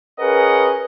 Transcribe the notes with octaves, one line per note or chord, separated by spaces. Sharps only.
C#4 G#4 A#4 B4 D#5 F#5